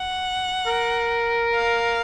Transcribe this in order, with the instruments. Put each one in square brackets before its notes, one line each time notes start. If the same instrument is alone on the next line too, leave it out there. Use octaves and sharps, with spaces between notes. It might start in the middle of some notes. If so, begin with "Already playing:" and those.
Already playing: [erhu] F#5
[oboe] A#4
[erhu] F5